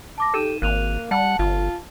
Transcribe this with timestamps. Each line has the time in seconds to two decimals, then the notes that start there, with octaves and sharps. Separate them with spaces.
0.18 A5 D6 A#6
0.34 D#4 G4 A4 D#7 E7
0.62 G#1 A#3 F#6 D#7 F7
1.11 G3 F#5 A5
1.39 G1 F4